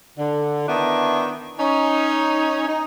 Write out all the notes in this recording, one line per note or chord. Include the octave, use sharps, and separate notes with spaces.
D3
D#3 B3 D4 E4
C#4 D#4
D#4